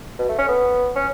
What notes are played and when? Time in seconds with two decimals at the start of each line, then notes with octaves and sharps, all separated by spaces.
0.19 B2
0.29 A3
0.38 C#4
0.48 B3
0.96 C#4